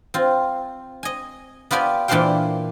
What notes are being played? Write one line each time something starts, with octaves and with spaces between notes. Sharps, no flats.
C4 F4
D#5 G#5
B3 F4 G4 D5 G#5
A#2 E3 D4 C5 F5 G5